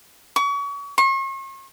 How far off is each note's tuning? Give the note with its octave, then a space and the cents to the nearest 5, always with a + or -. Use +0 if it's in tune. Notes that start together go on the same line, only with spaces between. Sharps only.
C#6 +35
C#6 -45